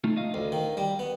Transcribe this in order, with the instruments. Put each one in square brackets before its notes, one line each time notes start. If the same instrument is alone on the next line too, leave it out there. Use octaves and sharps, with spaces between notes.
[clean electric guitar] A3 D#4 F4
D#5 F5
[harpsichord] D2
D#3
G3
B3